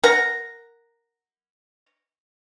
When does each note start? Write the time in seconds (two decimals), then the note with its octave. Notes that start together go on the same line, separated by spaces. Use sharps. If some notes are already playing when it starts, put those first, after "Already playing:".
0.04 A#4 F#5 A#5